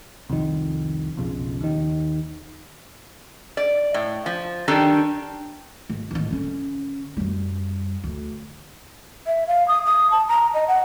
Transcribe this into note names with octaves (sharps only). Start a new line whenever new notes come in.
C2 F2 D#3
B1 F2 C#3
D#2 D#3
D5
A2
F3
D#3 G3 D4 A4 G5 A5
G#1
A1 D#3
D3 C#4
F#2 G3
D2
E5
F5
D#6
D#6
A5
A#5
D#5
F#5